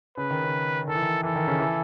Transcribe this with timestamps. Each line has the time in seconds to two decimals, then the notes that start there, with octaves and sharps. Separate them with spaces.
0.17 C#3 B4
0.31 D#3
0.44 C#3
0.88 D#3 A4
0.95 E3
1.02 D#3
1.23 E3 A4
1.36 D#3
1.47 C#3
1.59 E3